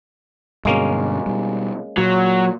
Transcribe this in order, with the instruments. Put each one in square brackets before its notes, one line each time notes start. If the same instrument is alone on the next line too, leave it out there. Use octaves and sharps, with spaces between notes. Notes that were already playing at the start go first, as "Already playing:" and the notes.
[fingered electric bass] G2 B2 D3 [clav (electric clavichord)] G#3 A#3 C#4
[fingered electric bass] B2 G3
[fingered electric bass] A#2 [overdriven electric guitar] F#3